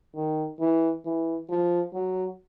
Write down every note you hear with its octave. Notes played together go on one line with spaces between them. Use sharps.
D#3
E3
E3
F3
F#3